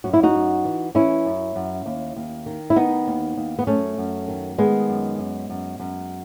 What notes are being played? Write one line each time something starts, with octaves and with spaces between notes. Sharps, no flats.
F#2 F#4
E4
D#4 F#4
F#2
E3
E3 C#4 E4
F#2
F#2
D#2
D#2
D#3
E4
D#3 B3 D#4
D#2
D#2
B3
F#2 A3 C#4
F#2
D#3
D#3 G#3 B3
F#2
F#2
F#2
F#2